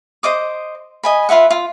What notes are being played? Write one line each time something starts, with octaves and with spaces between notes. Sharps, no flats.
C5 D#5 D6 D#6
D#5 G#5 B5
F4 B4 E5 F#5
F4